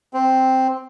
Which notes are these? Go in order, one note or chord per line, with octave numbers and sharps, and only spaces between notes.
C4